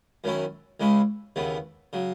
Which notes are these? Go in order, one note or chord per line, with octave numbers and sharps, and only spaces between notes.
F#2 D#3 F#3 C#4 E4
C#2 C#3 G#3 C#4 E4
D#2 C#3 E3 B3
C#3 F#3